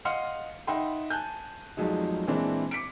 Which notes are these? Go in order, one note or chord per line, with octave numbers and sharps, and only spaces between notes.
D#5 F5 F#5 C6 F6 C#7
D#4 E5 F#5 G5 B5 C6
G#5 A5 F#6 G6
F1 F3 F#3 G#3 D#4
A#2 E3 G#3 C4 D4 E4
D6 B6 C#7 D7